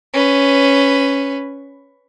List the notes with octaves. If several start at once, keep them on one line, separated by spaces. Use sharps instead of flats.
C#4 B4